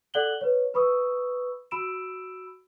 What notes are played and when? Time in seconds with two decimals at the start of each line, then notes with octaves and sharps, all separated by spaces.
0.14 A4 D5 F#5 F#6 F#7 G7
0.41 B4 C#5
0.74 B4 B5 C#6 D#6 E6
1.71 F#4 B5 E6 D7 E7